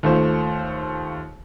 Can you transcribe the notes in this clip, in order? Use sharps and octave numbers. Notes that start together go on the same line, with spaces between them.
D#2 A3 F4 C5